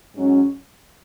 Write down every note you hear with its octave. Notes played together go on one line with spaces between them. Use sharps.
G#2 F#3 C#4